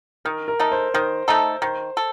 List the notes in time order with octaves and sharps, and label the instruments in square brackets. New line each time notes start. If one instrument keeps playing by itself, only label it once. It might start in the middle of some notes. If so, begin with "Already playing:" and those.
[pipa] D#3 [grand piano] A#4
[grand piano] A#4
[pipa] A3 D#4 A4
[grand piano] C5
[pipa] D#3 [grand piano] C5
[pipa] A3 D#4 A4
[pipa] D#3 [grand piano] C5
[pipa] A4